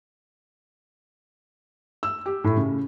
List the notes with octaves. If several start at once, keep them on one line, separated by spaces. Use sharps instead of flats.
E6
G4
A2
C#3